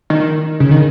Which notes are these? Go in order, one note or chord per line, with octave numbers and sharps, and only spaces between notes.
D#3
C#3
D#3